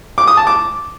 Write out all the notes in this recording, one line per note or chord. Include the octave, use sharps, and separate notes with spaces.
D6
D#6
A5
D6